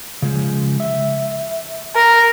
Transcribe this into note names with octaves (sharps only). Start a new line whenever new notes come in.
C#3 F3 G#3
E5
A#4